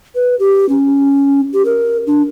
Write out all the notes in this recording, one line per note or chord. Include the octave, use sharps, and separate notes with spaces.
B4
G4
C#4
G4
A#4
D4